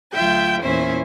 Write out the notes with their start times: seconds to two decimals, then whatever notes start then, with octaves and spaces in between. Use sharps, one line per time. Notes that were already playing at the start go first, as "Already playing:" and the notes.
0.13 D2 F#3 F4 E5 G5 G6
0.62 E2 A#2 C#4 E4 C5 E5